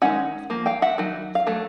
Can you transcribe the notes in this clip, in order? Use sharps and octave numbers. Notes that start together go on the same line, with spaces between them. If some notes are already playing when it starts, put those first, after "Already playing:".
D#3 G#3 C#4 F#5
F3 A#3
F5 G5
E5 F#5
D#3 F#3
F5
F#3 A3